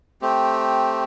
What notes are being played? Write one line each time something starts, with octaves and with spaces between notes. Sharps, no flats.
A3 C4 G4